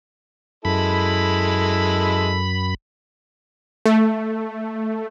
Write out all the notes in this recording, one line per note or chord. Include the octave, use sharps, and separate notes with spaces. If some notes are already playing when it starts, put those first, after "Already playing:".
F#2 G#3 E4 A4 B5
A3